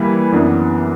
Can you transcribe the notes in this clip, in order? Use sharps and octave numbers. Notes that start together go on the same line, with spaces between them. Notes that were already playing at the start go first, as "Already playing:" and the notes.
Already playing: E3 G3 A#3 E4 B4
F#2 E3 B3 D4